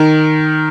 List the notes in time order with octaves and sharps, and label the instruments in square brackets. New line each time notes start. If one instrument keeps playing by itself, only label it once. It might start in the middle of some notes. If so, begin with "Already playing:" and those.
Already playing: [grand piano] D#3